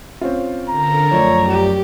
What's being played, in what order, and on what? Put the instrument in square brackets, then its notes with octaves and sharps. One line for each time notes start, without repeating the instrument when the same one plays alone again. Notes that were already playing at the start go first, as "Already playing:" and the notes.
[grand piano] C4 C#4 F4
[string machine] D3 A4 A#4 [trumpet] A#5
[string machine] F#2 [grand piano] F3 A3 D5 [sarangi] C#5
[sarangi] G4